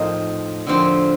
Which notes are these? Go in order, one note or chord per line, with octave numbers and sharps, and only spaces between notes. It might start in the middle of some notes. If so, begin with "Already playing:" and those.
Already playing: A2 F3 C4 D#4 A#4
D3 F3 C4 G4 C5